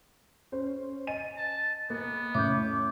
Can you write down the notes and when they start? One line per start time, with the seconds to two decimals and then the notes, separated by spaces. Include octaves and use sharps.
0.52 C#4 C5
1.07 D#5 G#5 D#7
1.37 A5
1.90 A#3 B3
2.35 A2 C#4 E5 D6 G6